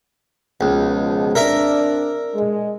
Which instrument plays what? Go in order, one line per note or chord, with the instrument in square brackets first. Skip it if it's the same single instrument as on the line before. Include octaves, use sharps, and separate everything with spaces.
[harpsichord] C#2 [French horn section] B2 F3
[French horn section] C4 D4 D5 [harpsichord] A#4 E5
[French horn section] G#3